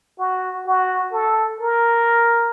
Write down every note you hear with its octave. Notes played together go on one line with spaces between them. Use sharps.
F#4
F#4
A4
A#4